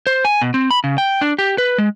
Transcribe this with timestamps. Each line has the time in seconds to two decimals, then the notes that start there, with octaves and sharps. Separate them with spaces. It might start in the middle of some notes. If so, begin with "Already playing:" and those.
0.07 C5
0.25 G#5
0.42 B2
0.54 C4
0.71 B5
0.84 C#3
0.98 G5
1.21 D4
1.39 G4
1.58 B4
1.78 G#3